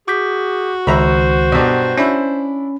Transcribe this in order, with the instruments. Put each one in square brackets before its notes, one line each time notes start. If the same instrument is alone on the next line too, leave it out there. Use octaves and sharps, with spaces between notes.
[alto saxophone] F#4 [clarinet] G#4 [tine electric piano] D6 G6 B6
[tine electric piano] C#2 D#3 [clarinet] C5 [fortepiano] E5 A#5 B5
[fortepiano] B1 G2
[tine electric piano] C#4 B5 [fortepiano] D4 E4